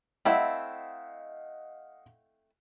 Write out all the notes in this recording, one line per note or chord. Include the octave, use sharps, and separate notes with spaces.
A3 C4 E4 D#5 F5 F#5